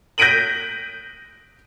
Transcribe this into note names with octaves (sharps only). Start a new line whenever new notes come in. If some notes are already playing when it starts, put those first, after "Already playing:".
G6 A#6 B6 D7 D#7 F#7